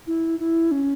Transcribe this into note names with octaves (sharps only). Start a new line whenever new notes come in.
E4
E4
C#4